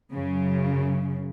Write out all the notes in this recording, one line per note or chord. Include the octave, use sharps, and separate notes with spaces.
F#2 C#3